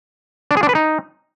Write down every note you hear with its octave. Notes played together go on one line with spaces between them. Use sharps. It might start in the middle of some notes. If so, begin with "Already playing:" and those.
D4
G#4
D4
B4
D#4